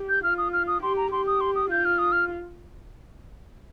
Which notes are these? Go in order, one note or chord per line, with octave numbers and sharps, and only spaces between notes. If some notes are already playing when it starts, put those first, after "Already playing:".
Already playing: G4
G6
F4 F6
D#6
F6
D#6
G4 C6
A#5
G4 C6
D#6
C6
D#6
F4 G6
F6
D#6
F6